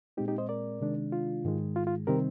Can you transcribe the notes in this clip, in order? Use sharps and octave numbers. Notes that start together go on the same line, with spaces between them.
A#2 G#3 C4 D#4 G4
D#4 G4
C5 D#5
A#4 D5
C3 D#3 G#3 D4
F4
G#2 D#3 G#3
F4
F4
C3 D#3 G3 C4 G4 A#4